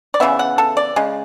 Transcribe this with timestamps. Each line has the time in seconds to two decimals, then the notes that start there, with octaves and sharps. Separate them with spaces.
0.14 D5
0.20 C#3 E3 B3 E5
0.39 F#5
0.58 A4
0.77 D5
0.96 C#3 G#3